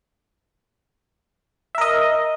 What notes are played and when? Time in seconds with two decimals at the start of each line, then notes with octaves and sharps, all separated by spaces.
1.75 E5
1.78 A#4
1.81 D#5